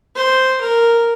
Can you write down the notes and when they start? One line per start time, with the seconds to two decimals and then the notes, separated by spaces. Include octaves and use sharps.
0.15 C5
0.61 A#4